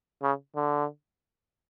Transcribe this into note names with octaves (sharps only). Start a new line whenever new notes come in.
C#3
D3